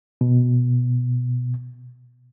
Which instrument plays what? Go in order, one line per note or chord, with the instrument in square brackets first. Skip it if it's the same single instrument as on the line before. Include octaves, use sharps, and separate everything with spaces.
[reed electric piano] B2